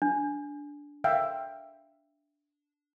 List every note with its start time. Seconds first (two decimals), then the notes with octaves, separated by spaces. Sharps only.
0.02 D4
1.04 E5 F5 G5